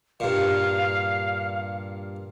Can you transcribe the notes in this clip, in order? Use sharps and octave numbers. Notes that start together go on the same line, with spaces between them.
G2 A#2 F5